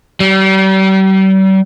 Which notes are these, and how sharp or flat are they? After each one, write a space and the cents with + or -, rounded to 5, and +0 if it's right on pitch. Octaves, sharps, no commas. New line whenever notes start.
G3 -40